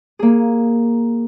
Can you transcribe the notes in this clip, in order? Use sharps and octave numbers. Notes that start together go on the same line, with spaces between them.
A#3 G#4